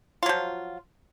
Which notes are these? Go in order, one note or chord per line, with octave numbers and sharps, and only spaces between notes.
F3 F#3 F4